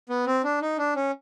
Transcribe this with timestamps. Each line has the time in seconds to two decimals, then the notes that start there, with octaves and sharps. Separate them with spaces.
0.09 B3
0.26 C4
0.44 D4
0.61 D#4
0.78 D4
0.96 C#4